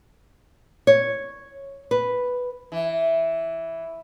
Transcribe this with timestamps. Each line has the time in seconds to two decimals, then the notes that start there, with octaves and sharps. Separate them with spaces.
0.87 C#5
1.91 B4
2.72 E3